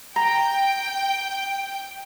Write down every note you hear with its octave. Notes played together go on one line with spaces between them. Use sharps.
G5 A#5